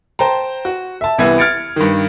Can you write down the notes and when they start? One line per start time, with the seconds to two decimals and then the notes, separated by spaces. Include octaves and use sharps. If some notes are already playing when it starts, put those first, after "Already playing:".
0.19 C5 G5 A5 A#5
0.65 F#4
1.01 E5 A5
1.18 C2 E3 B3 E5 G#6
1.38 F6 G#6 A6 C#7 D7
1.76 G2 D#3